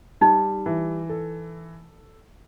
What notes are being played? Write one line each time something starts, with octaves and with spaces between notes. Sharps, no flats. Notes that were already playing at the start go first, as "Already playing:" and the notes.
G3 D#4
E3
A4